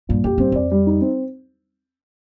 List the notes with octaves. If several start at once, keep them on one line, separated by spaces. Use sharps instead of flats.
G2 A#2
F2 G4
G2 C4
F2 D5
G3
D#4
C4